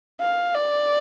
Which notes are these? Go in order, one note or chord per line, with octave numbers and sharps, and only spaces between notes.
F5
D5